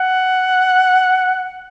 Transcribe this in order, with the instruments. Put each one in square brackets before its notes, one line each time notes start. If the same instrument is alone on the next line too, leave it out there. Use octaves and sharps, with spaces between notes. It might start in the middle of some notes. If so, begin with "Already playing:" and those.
Already playing: [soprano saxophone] F#5